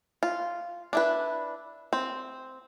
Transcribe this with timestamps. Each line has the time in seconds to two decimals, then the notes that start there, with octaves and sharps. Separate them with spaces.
0.23 F4
0.93 D4 E4 B4
1.93 C4